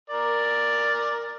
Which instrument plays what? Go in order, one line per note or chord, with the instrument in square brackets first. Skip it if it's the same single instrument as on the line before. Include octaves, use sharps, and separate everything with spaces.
[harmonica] A#4 D5